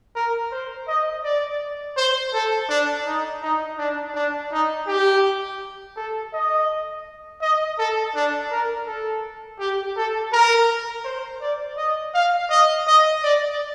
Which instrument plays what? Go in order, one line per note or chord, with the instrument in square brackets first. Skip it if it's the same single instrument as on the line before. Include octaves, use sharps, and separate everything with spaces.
[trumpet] A#4
C5
D#5
D5
C5
A4
D4
D#4
D#4
D4
D4
D#4
G4
A4
D#5
D#5
A4
D4
A#4
A4
G4
A4
A#4
C5
D5
D#5
F5
D#5
D#5
D5